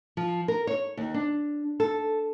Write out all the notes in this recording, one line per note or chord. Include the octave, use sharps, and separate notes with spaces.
F3
A#4
C#5
D#2
D4
A4